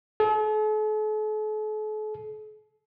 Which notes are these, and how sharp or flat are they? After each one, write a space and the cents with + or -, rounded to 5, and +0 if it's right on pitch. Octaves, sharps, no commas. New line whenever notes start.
A4 -45